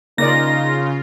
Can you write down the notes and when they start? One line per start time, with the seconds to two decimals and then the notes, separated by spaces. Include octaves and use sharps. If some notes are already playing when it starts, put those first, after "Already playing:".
0.18 C#3 A#3 D#4 F4 D5 A#6